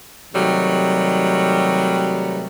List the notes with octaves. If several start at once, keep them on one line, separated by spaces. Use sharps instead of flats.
C3 D#3 F#3 G3 A3